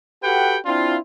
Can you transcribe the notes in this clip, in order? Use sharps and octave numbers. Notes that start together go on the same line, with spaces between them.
F#4 G4 A4 B4 F#5 G5
C4 D4 E4 F4